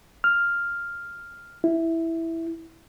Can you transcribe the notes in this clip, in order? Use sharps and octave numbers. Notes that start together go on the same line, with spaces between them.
F6
E4